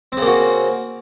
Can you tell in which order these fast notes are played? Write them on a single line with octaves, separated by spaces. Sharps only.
C4 C#3 A#3 F#4